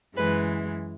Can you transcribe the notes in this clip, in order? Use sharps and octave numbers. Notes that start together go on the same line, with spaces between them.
F#2 E3 G#3 B4